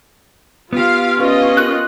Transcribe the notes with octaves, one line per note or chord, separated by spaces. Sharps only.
B3 F4 G4 F5
C#4 F4 B4 D5 D#5 F5
F#4 A#4 F#6